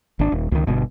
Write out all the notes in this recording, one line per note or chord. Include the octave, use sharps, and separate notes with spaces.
G#1 D4
D#1
C#2 D#3
G1 B2